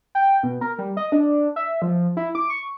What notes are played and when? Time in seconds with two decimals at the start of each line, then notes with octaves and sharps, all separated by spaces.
0.15 G5
0.43 B2
0.61 A#4
0.79 G3
0.97 D#5
1.12 D4
1.56 E5
1.82 F3
2.17 E4
2.35 D6
2.50 C#6